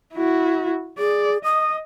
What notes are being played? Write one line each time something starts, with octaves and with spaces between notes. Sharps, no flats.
E4 F#4
G#4 D5
D#5 D#6